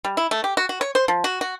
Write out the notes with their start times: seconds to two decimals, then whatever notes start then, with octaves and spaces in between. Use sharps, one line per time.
0.05 G3
0.17 E4
0.31 A3
0.44 G4
0.57 F#4
0.69 F#4
0.81 C#5
0.95 C5
1.08 F3
1.24 F#4
1.41 F#4